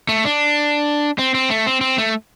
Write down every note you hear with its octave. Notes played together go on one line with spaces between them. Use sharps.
A3
D4
C4
C4
A3
C4
C4
A3